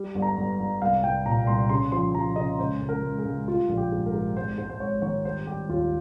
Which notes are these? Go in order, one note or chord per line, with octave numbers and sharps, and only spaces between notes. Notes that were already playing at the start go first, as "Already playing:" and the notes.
Already playing: G3
G1
A#5
G1
G1
C2 F5
C2 G5
A#2 A#5
C2 C6
C#3 C6
F3 C6
F3 A#5
C#3 D#5
C#2 C5
C#2
A#4
C#2
G#4
C#2
G3 F4
A#1
G4
G#2
A#4
G#2
G#1 C5
G#2 C5
C5
G#1 C#5
D#3 C#5
G3 C5
G3 G4
D#2 F4